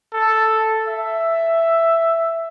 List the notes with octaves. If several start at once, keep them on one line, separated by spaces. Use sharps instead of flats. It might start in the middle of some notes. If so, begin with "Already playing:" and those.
A4
E5